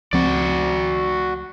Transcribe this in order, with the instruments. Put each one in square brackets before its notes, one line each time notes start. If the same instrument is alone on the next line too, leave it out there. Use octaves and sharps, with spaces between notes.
[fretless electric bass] C#2 F3 C4 [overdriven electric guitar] F#4 D5